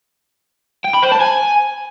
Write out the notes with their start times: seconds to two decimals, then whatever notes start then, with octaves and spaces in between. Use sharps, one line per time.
0.84 G5
0.93 B5
1.02 C5
1.11 A5
1.21 G#5